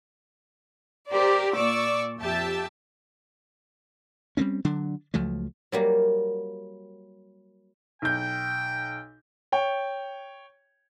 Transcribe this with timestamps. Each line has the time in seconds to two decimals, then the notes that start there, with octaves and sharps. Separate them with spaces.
1.08 G4 A#4 C5 D5
1.55 A#2 D5 C#6 D6 E6
2.21 F2 G4 E5 A5
4.37 G3 A3 C4 C#4
4.65 D3 F#3 D4
5.14 C#2 F3 F#3 A3
5.72 F#3 G3 A#3
8.02 B1 G5 G6
9.52 C#5 G5